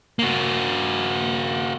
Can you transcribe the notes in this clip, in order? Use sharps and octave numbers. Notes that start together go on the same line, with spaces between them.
A#3 F#4